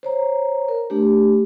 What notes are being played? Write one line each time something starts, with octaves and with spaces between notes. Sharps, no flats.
C5 C#5 A#5
A#4
A3 D4 G4